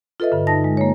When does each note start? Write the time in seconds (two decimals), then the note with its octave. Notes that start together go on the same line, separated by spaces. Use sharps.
0.20 F4 A4 B4 D#5 E5
0.32 G2 D3
0.47 D#4 A5 A#6
0.64 G#3
0.77 A#3 C#5